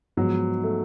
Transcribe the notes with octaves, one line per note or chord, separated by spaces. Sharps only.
G#2 F3 F#3 B3
A3